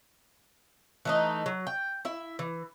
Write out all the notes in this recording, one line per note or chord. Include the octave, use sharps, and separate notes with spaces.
E3 A3 D#4
F#3
G5
E4 E5
E3